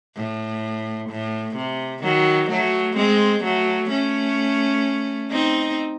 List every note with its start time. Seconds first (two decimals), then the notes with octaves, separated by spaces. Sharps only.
0.16 A2
1.10 A2
1.56 C3
2.03 D#3 F#3
2.50 F#3 A3
2.97 G#3 C4
3.44 F#3 A3
3.90 A3 C#4
5.31 C4 D#4